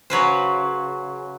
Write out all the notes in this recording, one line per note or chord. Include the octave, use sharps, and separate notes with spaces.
C#3 F#3 B4 C5